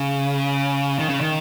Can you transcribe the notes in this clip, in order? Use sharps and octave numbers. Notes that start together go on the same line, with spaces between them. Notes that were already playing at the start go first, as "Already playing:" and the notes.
Already playing: C#3
D#3
C#3
D#3